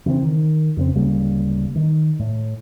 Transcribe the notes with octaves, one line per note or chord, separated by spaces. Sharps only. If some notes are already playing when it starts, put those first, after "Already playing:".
C#3 E3 A#3 C4
D#3
F2 C#3 C4
D1 C#3 G3 A#3
D#3
A2